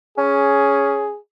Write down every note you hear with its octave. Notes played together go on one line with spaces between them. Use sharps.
C#4 G#4